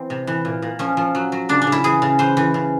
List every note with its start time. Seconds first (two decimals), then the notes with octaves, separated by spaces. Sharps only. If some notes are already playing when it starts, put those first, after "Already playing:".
Already playing: E3 C4
0.10 C3
0.27 E3
0.45 A#2
0.62 A#2
0.79 F3 C#4
0.97 F3
1.15 F#3
1.32 F#3
1.49 C#3 D4
1.62 D4
1.67 C#3
1.72 E4
1.84 E3 G#4
2.02 C#3
2.19 E3 C5
2.37 E3
2.54 C#3